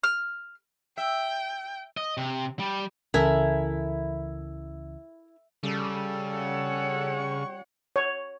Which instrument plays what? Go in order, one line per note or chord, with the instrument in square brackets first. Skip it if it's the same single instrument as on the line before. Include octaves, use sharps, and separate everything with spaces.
[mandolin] F6
[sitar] E5 [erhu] G5
[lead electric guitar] D#5
C3
G3
[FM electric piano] C#2 C#3 E3 [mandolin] E4 [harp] A4 G#5 [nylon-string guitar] A#4
[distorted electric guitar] C#3 [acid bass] G3 [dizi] A4
[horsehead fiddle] C#5 F#5
[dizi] C#6
[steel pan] C#5